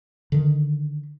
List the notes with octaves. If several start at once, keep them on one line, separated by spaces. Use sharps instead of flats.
D3 D#3